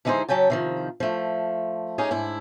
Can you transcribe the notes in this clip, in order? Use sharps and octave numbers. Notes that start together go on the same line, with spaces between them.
D3 E3 G#3 D#4 G4 C5
C#3 F#3 C#4 G5 A5
C3 D#3 F3
F3 A3
C#4 D#4 G4 G#4
G#2 D4 E4